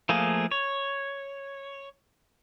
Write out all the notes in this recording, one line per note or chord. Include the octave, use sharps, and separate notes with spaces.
F3 A3 A#3 G#4
C#5